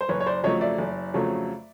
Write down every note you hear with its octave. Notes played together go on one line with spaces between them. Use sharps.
C5
F#1 B4 C#5
C#5
C5 D5
F2 C#3 F#3 A3 C#5 D#5
D5 E5
F#1
F2 C#3 F#3 A3